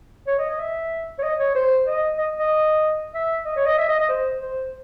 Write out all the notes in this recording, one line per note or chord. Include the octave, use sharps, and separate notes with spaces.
C#5
D#5
D#5
E5
C#5
D#5
C#5
C5
D#5
D#5
D#5
E5
D#5
C#5
D#5
E5
D#5
D#5
C5
C5